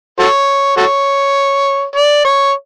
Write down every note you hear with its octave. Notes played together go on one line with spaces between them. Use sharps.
F#4 A4 C#5
F#4 A4 C#5
D5
C#5